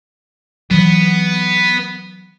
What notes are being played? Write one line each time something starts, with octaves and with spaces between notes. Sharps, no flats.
E3 F#3 B3